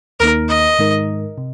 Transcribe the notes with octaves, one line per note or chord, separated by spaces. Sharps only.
D#2 D#3 A#3 D#4 A#4
D#5
G#2 D#3 G#3 D#4 A#4
C3